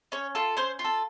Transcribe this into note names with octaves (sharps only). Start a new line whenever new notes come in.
C#4 C#5
F4 A4
C#4 C5
F4
A4